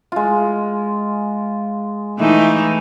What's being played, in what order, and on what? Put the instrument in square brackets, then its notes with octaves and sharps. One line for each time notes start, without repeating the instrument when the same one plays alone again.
[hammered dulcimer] G#3 F4
[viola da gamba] E3 A3 D#4